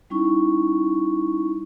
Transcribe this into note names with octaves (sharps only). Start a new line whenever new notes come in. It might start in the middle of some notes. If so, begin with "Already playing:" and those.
G3 C#4 D#4 E4 C#6